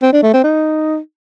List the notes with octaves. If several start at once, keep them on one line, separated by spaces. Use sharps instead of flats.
C4
D4
A3
C4
D#4